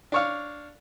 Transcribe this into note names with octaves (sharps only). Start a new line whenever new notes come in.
D4 C#5 F5